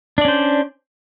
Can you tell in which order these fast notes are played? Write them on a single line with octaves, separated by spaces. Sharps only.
D4 D5 C#4 C5